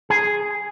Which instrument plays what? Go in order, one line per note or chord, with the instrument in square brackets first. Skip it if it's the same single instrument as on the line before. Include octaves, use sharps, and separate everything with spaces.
[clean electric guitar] G#4